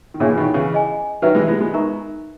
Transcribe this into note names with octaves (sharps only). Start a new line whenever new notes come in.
D#3
A#2 C#3 C#4 G#4 C#5 E5 G#5
E3
B2 D#3
C#3 E3
G#4 D#5 G#5
D#3 F#3 B4 E5 A#5
E3 G#3
G#3 B3
G#3 B3
D#4 A#4 E5 A#5 C#6